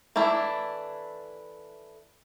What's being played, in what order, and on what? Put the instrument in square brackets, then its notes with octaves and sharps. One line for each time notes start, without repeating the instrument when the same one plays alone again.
[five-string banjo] E3 A3 D4 E4